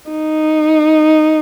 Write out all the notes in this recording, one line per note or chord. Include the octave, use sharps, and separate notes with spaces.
D#4